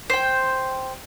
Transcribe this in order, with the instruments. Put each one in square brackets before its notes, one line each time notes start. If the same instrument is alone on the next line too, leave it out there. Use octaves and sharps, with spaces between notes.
[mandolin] C5 G5